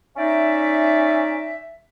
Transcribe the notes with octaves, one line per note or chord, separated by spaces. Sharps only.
C#4 D#4 D5 E5